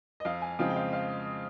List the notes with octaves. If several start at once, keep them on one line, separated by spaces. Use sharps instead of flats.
D#5
F2 F5
G#5
C#3 F3 G#3 C4 F5
G5
F5
F5